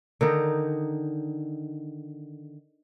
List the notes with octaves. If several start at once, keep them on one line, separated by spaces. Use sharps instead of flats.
D3 D#3 D#4